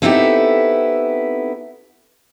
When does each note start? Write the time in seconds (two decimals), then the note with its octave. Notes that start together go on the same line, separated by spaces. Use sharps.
0.02 B3 C4 D#4 E4 G4 A4